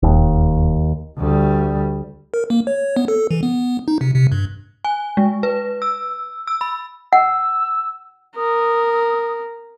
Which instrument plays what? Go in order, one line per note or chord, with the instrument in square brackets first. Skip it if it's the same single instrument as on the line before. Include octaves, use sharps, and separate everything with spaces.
[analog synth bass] E1 [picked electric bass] D#2
[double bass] D2 G3
[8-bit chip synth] A#4
A#3
C#5
B3
A4
E3
B3
D#4
C3
C3
G2
[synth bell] G#5
G#3
B4
E6
E6
B5
[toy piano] F#5 [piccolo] E6
[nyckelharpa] A#4 [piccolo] D#6